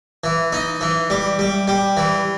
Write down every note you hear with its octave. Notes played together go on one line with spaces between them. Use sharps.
E3
D#4
E3
G3
G3
G3
E3